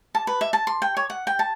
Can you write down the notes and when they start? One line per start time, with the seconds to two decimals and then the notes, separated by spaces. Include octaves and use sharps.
0.15 A5
0.27 B4
0.41 E5
0.53 A5
0.67 C6
0.82 G5
0.97 C#5
1.10 F#5
1.27 G5
1.39 A5